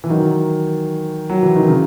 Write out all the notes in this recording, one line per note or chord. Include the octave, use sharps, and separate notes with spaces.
E3
D#3 F#3
F#3
E3
D#3
C#3